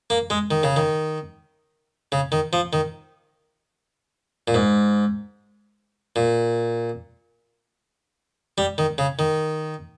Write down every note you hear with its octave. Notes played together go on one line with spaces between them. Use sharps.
A#3
G#3
D#3
C#3
D#3
C#3
D#3
F3
D#3
A#2
G#2
A#2
G3
D#3
C#3
D#3